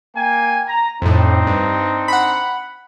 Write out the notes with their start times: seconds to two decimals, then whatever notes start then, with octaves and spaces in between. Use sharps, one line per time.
0.16 A#3 G5 G#5
0.67 A#5
1.02 F2 A2 C4 D4 D#4
1.47 G2
2.08 F#5 B5